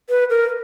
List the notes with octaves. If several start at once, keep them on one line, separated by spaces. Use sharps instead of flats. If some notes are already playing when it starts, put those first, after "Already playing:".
B4
A#4